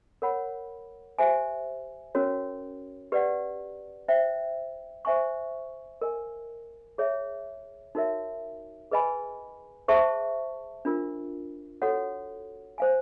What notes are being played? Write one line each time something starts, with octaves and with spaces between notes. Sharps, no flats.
A#4 C#5 F#5 B5
G4 C5 E5 G#5
C#4 F#4 A#4 C#5
G4 B4 D5 F#5
C5 E5 G5
C5 E5 G#5 C#6
A#4 D#5 G#5
G#4 C#5 E5
D#4 F#4 A#4 C#5 E5
G#4 B4 D#5 G#5 B5
G#4 C5 E5 A5 C#6
D4 F4 A#4
F#4 A4 C#5 F#5
C5 F5 G#5